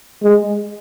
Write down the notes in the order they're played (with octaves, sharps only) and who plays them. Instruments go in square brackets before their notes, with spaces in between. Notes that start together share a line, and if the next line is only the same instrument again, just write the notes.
[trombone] G#3